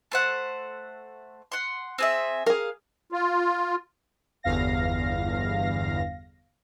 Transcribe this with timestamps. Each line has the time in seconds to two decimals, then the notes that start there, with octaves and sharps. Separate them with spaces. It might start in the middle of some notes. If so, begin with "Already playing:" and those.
0.12 A3 C5 F#5
1.52 F#5 C6
1.98 C4 G#4 E5
2.46 G#4 A#4 F5
3.12 F4
4.43 G1 E2 F5 A#6